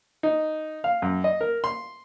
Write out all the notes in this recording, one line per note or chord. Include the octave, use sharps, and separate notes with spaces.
D#4
F5
F#2
D#5
A#4
C6